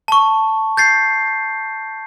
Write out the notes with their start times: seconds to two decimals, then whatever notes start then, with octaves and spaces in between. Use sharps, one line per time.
0.08 A5 C#6
0.77 G6 A6 C7